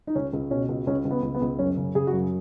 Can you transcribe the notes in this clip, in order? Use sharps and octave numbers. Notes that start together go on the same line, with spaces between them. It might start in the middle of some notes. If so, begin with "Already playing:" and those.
D#4
C#2 C#4
C#2
B2 C#4
C#2
C#2 C#4
C#2
B3
C#2
B3
C#2
F#2 C#4
C#3
C#3 G#4
F#4
F#2